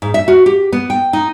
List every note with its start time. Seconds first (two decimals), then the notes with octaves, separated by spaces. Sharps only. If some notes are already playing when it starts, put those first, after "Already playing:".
0.02 G#2
0.14 E5
0.28 F#4
0.46 G4
0.72 B3
0.90 G5
1.13 D#4